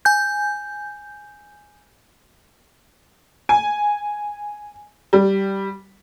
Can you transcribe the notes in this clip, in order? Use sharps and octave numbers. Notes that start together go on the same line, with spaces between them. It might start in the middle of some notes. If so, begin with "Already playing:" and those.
G#5 G6
G#5
G3